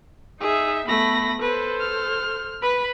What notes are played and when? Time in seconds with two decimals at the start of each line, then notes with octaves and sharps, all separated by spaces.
0.41 D#4 G#4 E5
0.88 A3 B3 B5 A#6
1.42 A4 B4 C5
1.80 F6
2.62 B4 B5